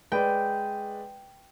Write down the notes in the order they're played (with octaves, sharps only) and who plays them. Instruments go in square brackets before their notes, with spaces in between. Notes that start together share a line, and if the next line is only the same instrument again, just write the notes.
[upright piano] G#3 B4 D5 [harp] G5